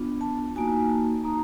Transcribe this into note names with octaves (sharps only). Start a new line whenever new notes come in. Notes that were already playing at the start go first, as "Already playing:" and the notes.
Already playing: B3 D4 F4
A5
A#3 D#4 F#4 G#5
A5
A#3 D#4 F#4 A#5